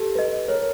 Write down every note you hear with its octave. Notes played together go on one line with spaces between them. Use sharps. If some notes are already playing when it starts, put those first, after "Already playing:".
Already playing: G4 A4
B4 D#5
A#4 C#5